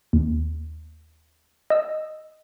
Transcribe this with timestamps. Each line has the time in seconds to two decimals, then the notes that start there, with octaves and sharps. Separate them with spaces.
0.13 D#2
1.70 D#5 E6